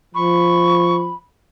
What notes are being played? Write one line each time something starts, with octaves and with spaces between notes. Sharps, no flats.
F3 B5 C#6